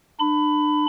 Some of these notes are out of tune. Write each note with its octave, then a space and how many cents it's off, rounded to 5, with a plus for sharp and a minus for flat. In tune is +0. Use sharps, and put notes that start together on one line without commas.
D4 +30 B5 +20